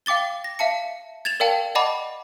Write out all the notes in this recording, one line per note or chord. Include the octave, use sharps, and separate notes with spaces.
F5 G5 D6 A6 G7
A#6
E5 F5 A5 C#7
G#6 A6 E7 F7
A#4 D5 F5 G5 A5
D5 D#5 F#5 A5 B5 D6